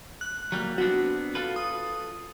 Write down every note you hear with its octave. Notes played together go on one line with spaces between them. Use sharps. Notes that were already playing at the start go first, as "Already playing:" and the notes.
F#6
F#3 G3 A#3
B3 C4 D4 F#4
F4 A4 B4
D#6